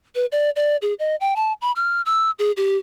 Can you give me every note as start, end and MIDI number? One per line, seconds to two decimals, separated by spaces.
0.15 0.25 71
0.32 0.50 74
0.56 0.76 74
0.82 0.94 68
0.99 1.16 75
1.21 1.34 79
1.36 1.53 81
1.62 1.72 83
1.76 2.01 89
2.06 2.30 88
2.39 2.51 68
2.57 2.77 67